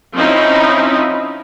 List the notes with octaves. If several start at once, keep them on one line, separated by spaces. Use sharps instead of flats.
F3 C4 C#4 D#4 E4